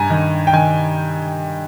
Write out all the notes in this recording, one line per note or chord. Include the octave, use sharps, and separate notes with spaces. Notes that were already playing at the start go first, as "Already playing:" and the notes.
Already playing: G2 G#5 A#5
D#3
G5
D#3 G#5